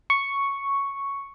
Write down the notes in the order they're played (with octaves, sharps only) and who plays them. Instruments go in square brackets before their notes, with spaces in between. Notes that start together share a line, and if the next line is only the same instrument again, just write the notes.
[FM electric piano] C#6